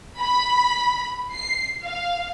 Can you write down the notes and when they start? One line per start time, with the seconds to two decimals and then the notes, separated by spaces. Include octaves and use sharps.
0.20 B5
1.33 C7
1.85 F5